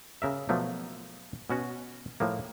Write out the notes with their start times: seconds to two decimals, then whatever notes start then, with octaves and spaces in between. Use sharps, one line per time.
0.22 C#3 A#4 E5
0.49 B2 F3 F#3 A3 A#3
1.50 B2 C#4 F#4
2.20 A2 F3 A#3